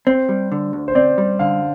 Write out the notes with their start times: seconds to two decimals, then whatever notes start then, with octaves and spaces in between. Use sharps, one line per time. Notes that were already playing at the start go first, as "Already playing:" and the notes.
0.07 C4 C5
0.29 G3
0.52 D3
0.73 D2
0.88 C5
0.95 C4 D5
1.18 G3
1.39 D3 F5